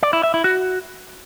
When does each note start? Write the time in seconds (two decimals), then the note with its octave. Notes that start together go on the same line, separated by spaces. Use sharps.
0.03 D5
0.13 E4
0.23 E5
0.34 E4
0.44 F#4